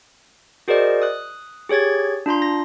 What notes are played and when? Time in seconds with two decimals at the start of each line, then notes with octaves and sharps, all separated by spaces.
0.68 F#4 G#4 A#4 C5 D5 D#5
1.02 D#6 F#6
1.69 G4 G#4 C#5 G#6 A6
2.26 D4 F4 A#5 C6
2.42 A#6